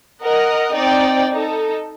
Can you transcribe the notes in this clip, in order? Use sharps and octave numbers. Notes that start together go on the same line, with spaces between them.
A#4 D#5 F#5
C4 D#4 D5 G5
D#4 A4